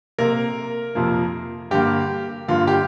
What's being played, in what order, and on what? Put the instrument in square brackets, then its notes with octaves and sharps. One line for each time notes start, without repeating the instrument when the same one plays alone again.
[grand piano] C3 A#3 A#4
F2 C3 F3 A#3
G2 D3 A#3 G4
G2 D3 A#3 F4
G4